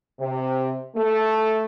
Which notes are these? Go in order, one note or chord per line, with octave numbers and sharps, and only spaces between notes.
C3
A3